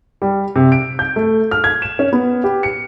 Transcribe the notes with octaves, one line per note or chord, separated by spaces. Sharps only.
G3
C3
D7
G6
A3
F6
G#6
E7
C#4
B3
G4
C#7